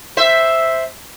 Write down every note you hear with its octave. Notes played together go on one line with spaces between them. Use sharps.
C5 E5